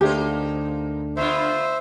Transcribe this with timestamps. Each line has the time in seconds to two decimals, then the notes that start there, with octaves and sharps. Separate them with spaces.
0.01 D2 A3 A#3 D4 D#4 G4 C5
1.17 D3 B3 F4 C5 E5